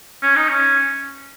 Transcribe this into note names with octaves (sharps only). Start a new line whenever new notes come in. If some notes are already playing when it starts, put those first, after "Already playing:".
C#4
D#4
C#4